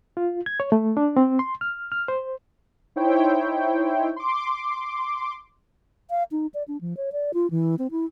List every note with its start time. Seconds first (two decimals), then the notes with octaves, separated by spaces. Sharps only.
0.17 F4
0.46 G#6
0.60 C#5
0.72 A3
0.97 D4
1.17 C4
1.39 C6
1.61 F6
1.92 F6
2.08 C5
2.96 D#4 E4 C5 C#5 G5
4.16 C6 D6
6.10 F5
6.31 D#4
6.54 D5
6.68 D4
6.81 F3
6.97 C#5
7.12 D5
7.34 F4
7.51 E3
7.79 C4
7.91 E4